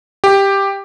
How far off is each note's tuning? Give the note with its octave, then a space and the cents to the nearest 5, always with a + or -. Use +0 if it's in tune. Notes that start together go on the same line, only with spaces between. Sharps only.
G4 +5